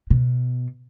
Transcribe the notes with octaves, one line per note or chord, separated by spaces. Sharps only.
B2